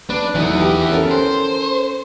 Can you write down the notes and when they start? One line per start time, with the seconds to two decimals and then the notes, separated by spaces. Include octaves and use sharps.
0.10 D4 B4
0.35 E3 F#3 A3 B3 D#4
0.61 G4
0.91 C#4 A4 A#4
1.11 C5